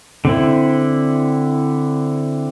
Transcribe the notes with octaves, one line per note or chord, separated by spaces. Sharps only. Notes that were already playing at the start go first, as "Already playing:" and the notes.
D3 C4 E4